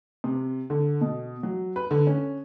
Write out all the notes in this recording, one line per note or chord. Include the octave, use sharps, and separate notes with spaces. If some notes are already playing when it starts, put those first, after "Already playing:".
C3
D3
B2
F#3
B4
D3
C#4